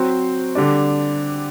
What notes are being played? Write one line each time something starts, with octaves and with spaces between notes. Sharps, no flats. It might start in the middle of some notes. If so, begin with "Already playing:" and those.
Already playing: F#3 C4 F#4 C5
D3 G3 D4